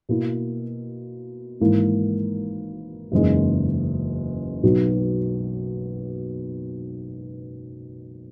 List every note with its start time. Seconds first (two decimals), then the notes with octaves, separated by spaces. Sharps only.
0.09 B2 A#3 E4
1.60 G#1 G#2 E3 A#3 E4
3.12 F#1 E2 C#3 G#3 D#4
4.63 B1 B2 F#3 B3